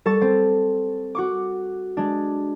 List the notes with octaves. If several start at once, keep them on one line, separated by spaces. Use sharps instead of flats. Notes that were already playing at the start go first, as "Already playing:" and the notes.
G3 A4 A5 C#6 A6
C4
F#4 C#6 D6
G#3 D4